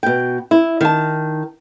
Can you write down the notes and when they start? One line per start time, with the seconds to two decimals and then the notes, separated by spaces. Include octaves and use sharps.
0.03 B2 G5
0.51 E4
0.81 D#3 A5